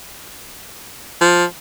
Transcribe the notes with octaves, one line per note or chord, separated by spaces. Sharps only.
F3